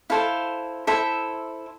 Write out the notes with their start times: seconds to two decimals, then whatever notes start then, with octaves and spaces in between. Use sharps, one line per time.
0.10 E4 A4 C5 F5
0.87 E4 A4 C5 E5